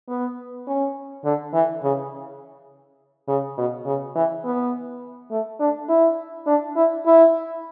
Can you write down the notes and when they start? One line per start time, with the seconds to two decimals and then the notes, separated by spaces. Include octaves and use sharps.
0.08 B3
0.67 C#4
1.25 D3
1.54 E3
1.83 C#3
3.28 C#3
3.58 B2
3.86 C#3
4.16 E3
4.45 B3
5.31 A3
5.60 D4
5.89 E4
6.47 D4
6.76 E4
7.06 E4